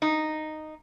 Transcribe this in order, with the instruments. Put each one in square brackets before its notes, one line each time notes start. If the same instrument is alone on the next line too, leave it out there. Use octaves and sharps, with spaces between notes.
[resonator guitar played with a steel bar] D#4